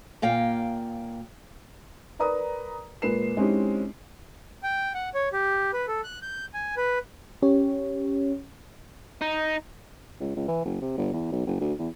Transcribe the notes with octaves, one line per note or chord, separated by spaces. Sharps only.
A#2 A#3 F5 G5
A#4 B4 D5 A#5 D#6
A#2 G#3 A#3 B4 C7 E7
G#3 C4 C#4 D#4 E4 G4
G5
F#5
C#5
G4
B4
A4
F#6
G6
G#5
B4
C#4 G4 C#5
D#4
C#2
C#2
E3
F#1
C3
G1
E2
B1
F#1
D2
E2